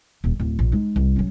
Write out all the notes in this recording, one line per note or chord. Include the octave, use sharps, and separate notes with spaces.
D#1
D1
A#1
G#3 D#4
C2
F#3 C#4